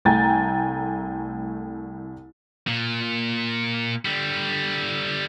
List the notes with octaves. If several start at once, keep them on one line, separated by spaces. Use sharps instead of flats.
C2 A3 G5 G#5 A#5 A6
A#2
D3 G3